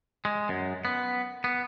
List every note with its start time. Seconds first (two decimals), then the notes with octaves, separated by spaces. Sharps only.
0.25 G#3
0.49 F#2
0.85 B3
1.44 B3